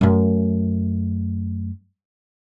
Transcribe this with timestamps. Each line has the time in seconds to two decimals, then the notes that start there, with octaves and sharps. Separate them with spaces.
0.01 F#2 A3